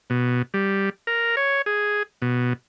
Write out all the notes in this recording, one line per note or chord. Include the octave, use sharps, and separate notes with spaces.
B2
G3
A#4
C#5
G#4
B2